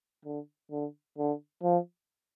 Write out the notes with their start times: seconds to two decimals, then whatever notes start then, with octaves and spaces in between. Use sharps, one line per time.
0.25 D3
0.72 D3
1.18 D3
1.64 F3